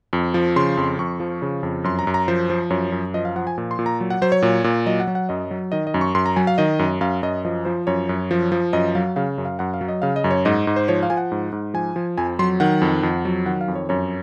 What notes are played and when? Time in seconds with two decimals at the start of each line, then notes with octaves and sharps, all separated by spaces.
0.13 F2
0.34 F3
0.56 C#3 C6
0.77 F2
0.99 F2 C#6
1.20 F3
1.42 C#3
1.63 F2
1.84 F#2 C6
1.99 A#5
2.07 F#2
2.14 A#5
2.28 F3 C5
2.50 F3
2.70 F#2 C#5
2.92 F#2
3.14 F3 D#5
3.25 F5
3.36 F3 F#5
3.47 G#5
3.58 A#2
3.71 C6
3.79 A#2
3.86 A#5
4.01 F#3
4.10 F#5
4.22 F#3 C5
4.32 C#5
4.42 A#2
4.64 A#2
4.86 F#3 D#5
5.00 F#5
5.07 F#3
5.15 F#5
5.29 F#2 D#5
5.51 F#3
5.72 D#3 D#5
5.87 D#5
5.94 F#2
6.01 C#6
6.15 F#2 C6
6.26 A#5
6.36 F#3 G#5
6.47 F5
6.58 D#3 D#5
6.79 F#2
7.01 F#2 F5
7.23 F#2 D#5
7.45 F3 D#5
7.65 F3 C5
7.87 F#2 C#5
8.09 F#2
8.31 F3
8.52 F3
8.73 F#2 D#5
8.95 F#3 F5
9.16 C#3 F5
9.38 F#2
9.45 F5
9.59 F#2 F#5
9.74 F5
9.81 F#3
9.88 D#5
10.02 C#3 F5
10.16 D#5
10.24 F#2
10.31 C#5
10.45 G#2 D#5
10.67 G#2
10.76 C5
10.88 F3 C#5
11.03 F5
11.10 F3 G#5
11.17 F#5
11.32 G#2
11.52 G#2
11.74 F3 G#5
11.96 F3
12.18 F2 G#5
12.39 F#3 C6
12.60 D#3 F#5
12.82 F2
13.03 F2
13.25 F#3
13.46 D#3 F#5
13.61 F5
13.68 F2
13.75 C#5
13.89 F#2 C#5